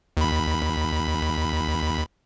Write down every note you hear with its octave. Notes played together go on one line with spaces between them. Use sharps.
D#2 B5